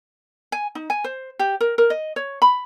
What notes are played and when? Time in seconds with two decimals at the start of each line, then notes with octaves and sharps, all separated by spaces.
0.52 G#5
0.75 D#4
0.90 G#5
1.04 C5
1.39 G4
1.61 A#4
1.78 A#4
1.90 D#5
2.16 C#5
2.42 B5